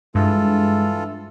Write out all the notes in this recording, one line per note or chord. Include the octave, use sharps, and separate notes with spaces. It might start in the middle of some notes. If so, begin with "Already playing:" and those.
G2 E3 G#3 F4 A4